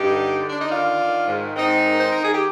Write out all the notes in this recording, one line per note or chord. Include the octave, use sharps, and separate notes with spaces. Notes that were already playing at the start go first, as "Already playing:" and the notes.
Already playing: G2 D#4 G4
D3
D3
D4
D#4
D#3 D4 F4
D#3
G#2
G#2 C4 D#4
D#3
C5
D#3 A#4
G#4
G4